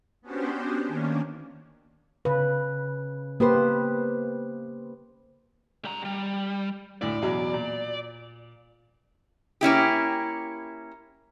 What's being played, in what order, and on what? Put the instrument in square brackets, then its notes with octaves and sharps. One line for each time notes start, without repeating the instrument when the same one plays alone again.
[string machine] B3 C#4 D4 F#4 G4 C5
D#3 A#3 C#4 D4
[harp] C#3 [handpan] B4
[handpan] A#3 G4 B4 [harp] B3 C5
[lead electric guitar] G3 A#5
G3
[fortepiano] D2 A2 E4 [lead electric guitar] D5
[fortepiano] E2 B2 F#3
A#2
[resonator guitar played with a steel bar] A#3 C#4 E4 G4